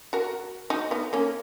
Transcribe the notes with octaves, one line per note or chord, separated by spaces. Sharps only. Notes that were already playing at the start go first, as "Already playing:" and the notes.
F#4 A#4
D#4 F#4
B3 D#4
A#3 C#4